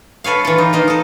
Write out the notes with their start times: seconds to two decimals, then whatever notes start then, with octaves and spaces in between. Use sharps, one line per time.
0.24 A4 B4 C#5 F5
0.45 E3 F4
0.58 D#4
0.73 A#3 D#4 F4
0.88 D#4 A4